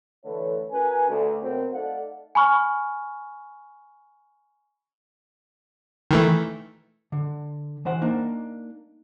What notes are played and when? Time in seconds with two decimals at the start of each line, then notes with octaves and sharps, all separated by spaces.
0.25 D3 E3 A3 A4 B4 C#5
0.71 C#4 F#4 A#4 B4 G#5
1.08 D2
1.41 B2 F#3 C4 A#4
1.73 A3 D#4 A4 D5 F5 F#5
2.35 G#5 B5 C#6 F6
6.11 D#3 E3 A3
7.12 D3
7.85 E3 C5 F#5
8.02 A#3 D4 D#4